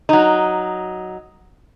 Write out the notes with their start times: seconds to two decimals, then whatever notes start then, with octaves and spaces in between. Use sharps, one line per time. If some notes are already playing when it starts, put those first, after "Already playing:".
0.09 F#3 D#4